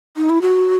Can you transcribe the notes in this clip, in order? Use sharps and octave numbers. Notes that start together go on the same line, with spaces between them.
D#4
E4
F#4